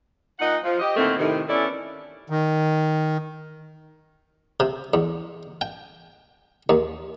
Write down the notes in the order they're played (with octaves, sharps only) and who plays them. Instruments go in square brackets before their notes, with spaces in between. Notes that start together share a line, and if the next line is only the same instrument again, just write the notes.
[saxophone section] A#2 D#4 D#5 F#5
F3
G4 D#5
A2 D3 D#3 A3 A#3 C4
A2 C3 D#3
E3 B3 C#4 E4 A4 D5
[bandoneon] D#3
[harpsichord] C3
E2
G5
D#2